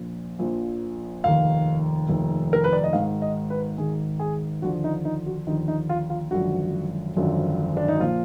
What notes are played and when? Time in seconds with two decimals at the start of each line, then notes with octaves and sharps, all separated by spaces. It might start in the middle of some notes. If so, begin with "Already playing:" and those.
Already playing: A#1 A#2 F3
0.39 A#1 A#2 F3
1.24 F1 D#2 D#3 F5
2.09 F1 D#2 D#3
2.53 A#4
2.64 B4
2.73 D5
2.84 D#5
2.93 G#1 G#2 D#3 F5
3.22 D#5
3.50 B4
3.78 G#1 G#2 D#3 G#4
4.19 G#4
4.62 D#2 D3 F3 F#4
4.84 D#4
5.05 D#4
5.26 F#4
5.47 D#2 D3 F3 D#4
5.68 D#4
5.89 F4
6.10 F4
6.31 G#1 F#2 D3 F3 F#4
7.17 G#1 F#2 D3 F3
7.77 D4
7.88 D#4
8.00 A#2 F3 F4